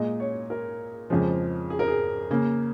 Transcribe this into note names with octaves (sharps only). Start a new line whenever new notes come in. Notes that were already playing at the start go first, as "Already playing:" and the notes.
Already playing: A#2 G#3 D#5
C#5
A#4
F2 C#3 F3 G#3
G#4
A#4
G#4
C#3 A#3